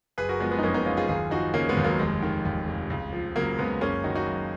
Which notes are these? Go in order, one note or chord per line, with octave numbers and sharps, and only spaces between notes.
F#1 G#4 B4
F#4 A#4
F3 G#3 B3
G#3 B3
D#4
F2 A#3 C#4
B3 D#4
F#1 C#4 F4
F4 G#4
D#2 F4 G#4
F3 D#4 F#4
C#3 A#3 C#4
G#3 B3
D#2
F#3 A#3
F1 G#3
D#3
D#2
F1
C#2
F3
C#3 F#3 A#3
C#2 G#3 B3
F#1 A#3 C#4
D#3 D#4 F#4
D#4 F#4
F#2